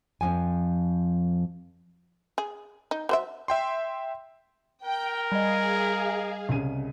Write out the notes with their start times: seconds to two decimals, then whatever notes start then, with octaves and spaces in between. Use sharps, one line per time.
0.21 F2 G#2 F3 G#5
2.38 G#4
2.91 D#4
3.09 F#3 C5 E5
3.48 E5 G5 C6
4.85 A#4 G5
5.32 G3 G#4 D#5 F5
6.49 C2 C#3 D#7